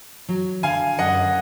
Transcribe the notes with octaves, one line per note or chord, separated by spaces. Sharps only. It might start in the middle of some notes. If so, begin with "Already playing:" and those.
F#3
D3 F5 G#5
F#2 D#5 F#5